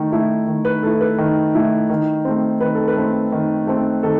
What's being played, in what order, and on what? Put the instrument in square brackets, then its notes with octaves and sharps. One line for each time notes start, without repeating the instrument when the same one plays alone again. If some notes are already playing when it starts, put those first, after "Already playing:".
Already playing: [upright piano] D#3 A3
A3 E4
D#3
B4
A3 E4 A4
B4
D#3
A3 E4
D#3
A3 C4
D#3 B4
A4
B4
A3 C4
D#3
A3 C4
D#3 A4